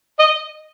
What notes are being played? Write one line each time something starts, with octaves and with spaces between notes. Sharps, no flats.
D#5